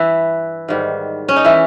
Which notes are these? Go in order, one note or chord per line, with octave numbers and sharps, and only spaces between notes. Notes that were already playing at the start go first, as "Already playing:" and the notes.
Already playing: G2 E3 E4
G#2 D#3 G3
C#4
D#4
E3 E4